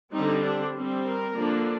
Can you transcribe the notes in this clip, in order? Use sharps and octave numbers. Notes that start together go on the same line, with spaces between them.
D3 G3 C4 D#4
D4
G3 C4
A#4
D3 F3 A#3 D4